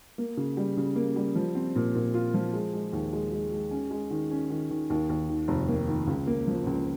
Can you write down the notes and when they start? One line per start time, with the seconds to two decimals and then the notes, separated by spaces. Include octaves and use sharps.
0.18 A#3
0.37 C#3
0.57 G3
0.77 C#3
0.96 A#3
1.16 G3
1.35 F3
1.55 C4
1.76 A#2
1.95 A#2
2.14 F4
2.34 F3
2.53 G#3
2.73 G#3
2.93 D#2
3.13 G#3
3.32 G#3
3.51 G#3
3.71 C#4
3.91 G#3
4.10 D#3
4.31 C#4
4.50 D#3
4.71 D#3
4.90 D#2
5.09 D#2
5.29 D#3
5.48 F1
5.68 A#3
5.88 D#3
6.07 C#2
6.27 A#3
6.47 F3
6.67 C#2